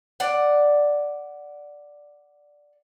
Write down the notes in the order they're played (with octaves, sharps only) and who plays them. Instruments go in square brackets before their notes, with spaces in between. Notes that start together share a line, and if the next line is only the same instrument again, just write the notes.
[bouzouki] D5 F#5